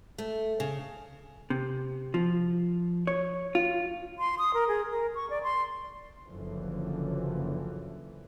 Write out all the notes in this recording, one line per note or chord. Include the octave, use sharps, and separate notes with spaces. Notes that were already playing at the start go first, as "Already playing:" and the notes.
A3
C#3
C3
F3
C#5
F4
C6
D#6
A#4
G#4
A#4
C#6
D5
C6
F#1 F#2 D3 E3 F3